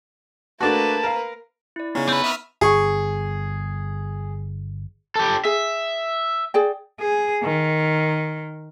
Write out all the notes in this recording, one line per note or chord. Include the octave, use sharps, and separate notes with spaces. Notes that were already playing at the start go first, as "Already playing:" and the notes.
A3 A#3 D4 F#4 B4 A5
A#4 F5
E4 D5
C#3 B3 C#4 D#4 C#6
C4 B4 E6
E5 D#6 F6
G1 G#4 C#6
G4 A4
G#4 E5
G#4 D5 G5
G#4
D#3